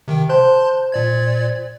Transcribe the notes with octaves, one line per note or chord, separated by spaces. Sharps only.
C3 D#3 G5
C5 A5 C6 G6
A#2 D5 G#6